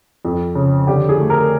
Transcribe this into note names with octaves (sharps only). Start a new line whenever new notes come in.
F2
C#3
D3 G4
G#4
A3
A#4